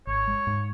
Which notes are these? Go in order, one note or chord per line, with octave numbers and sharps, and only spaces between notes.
G#1 C#5
G#3
G#2